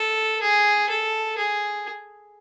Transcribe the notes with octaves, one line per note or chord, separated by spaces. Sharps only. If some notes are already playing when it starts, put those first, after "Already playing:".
Already playing: A4
G#4
A4
G#4